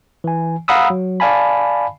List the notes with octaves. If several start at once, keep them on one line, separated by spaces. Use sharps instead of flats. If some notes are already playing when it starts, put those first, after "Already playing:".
E3 G#5
F5 F#5 A#5 B5 D#6 E6
F#3
D5 F5 G#5 A5 B5